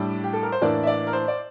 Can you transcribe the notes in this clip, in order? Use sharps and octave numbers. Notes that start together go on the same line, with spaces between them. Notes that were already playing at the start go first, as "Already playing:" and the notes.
Already playing: A2 G3 D4
G4
A4
A#4
C5
A2 E3 A#3 D4 D5
E5
D5
A#4
C5
D5